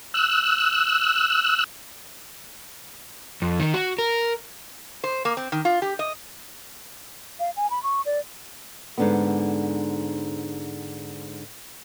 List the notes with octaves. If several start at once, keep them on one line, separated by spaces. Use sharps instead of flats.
E6 F#6
F2
D#3
F#4
A#4
C5
A#3
C4
D#3
F4
G4
D#5
F5
G#5
B5
C#6
D5
G#2 D3 B3